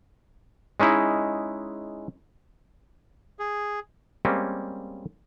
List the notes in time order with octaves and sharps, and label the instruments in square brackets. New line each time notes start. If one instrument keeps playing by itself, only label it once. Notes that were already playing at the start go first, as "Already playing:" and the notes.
[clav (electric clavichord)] G#3 C#4 D#4 E4
[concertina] G#4
[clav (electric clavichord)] G3 G#3 A#3 C4 C#4